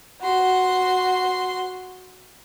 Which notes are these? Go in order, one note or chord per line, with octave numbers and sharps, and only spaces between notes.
F#4 C6